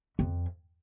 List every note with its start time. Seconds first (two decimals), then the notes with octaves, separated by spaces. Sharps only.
0.19 F2